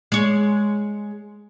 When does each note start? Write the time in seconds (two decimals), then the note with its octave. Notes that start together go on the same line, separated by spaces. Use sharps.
0.12 G#3 C#5